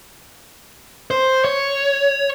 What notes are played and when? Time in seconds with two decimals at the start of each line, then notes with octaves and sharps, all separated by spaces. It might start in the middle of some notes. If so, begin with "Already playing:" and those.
1.11 C5
1.45 C#5